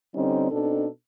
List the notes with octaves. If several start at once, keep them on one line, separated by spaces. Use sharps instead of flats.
D3 G3 C4 C#4 D#4
B2 C4 D4 D#4 A4